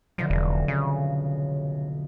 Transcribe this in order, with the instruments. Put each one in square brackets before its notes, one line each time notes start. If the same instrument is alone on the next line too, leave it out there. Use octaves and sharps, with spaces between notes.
[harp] F1 B1 D3 [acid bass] F3
[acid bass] E1
C#3